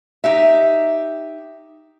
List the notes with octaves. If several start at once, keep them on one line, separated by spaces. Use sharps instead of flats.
D#4 G4 E5